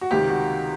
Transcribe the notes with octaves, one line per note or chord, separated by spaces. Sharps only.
F#4
C#2 C3 D#3 G4
F#4